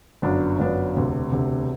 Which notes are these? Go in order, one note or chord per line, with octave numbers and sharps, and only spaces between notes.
G1 F#2 F#3 B3 D4
G1 F#2 F#3 B3 D4
E1 D2 C3
E1 D2 C3